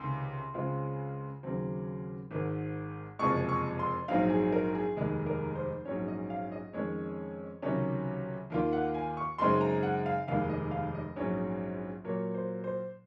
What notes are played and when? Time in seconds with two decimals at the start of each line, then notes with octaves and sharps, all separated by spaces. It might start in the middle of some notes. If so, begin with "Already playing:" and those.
Already playing: C#2 C3 D#3 C6
0.54 C#2 C#3 G#3 C4 F4
1.43 D#2 C#3 F#3 C4
2.31 G#1 G#2 D#3
3.19 F#1 F2 C3 F3 G#3 C#6
3.49 C#6
3.79 C6
4.08 A#1 G#2 F#3 C4 D#4 F5
4.30 G#4
4.52 A#4
4.75 G#4
4.96 F1 D#2 D#3 G#3 D#4
5.26 A#4
5.55 C5
5.85 A#1 G#2 F#3 C#4 C#5
6.08 D#5
6.30 F5
6.52 D#5
6.73 F2 D#3 G#3 C#4 C#5
7.62 C#2 C3 D#3 F#3 C#4
8.50 D#2 D#3 A#3 F4
8.73 F#5
8.94 G#5
9.17 C#6
9.38 F#2 C#3 G#3 C4 D#4 C6
9.61 A#5
9.83 F#5
10.06 F5
10.28 F1 D#2 D#3 G#3 F5
10.49 D#5
10.71 F5
10.94 D#5
11.16 A#1 G#2 F#3 C#4
12.04 A#2 F#3 A#3 C#5
12.34 C5
12.64 C5